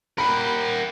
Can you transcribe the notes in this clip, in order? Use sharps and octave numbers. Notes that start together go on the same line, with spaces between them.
A#3 A#4 F#5 G5 B5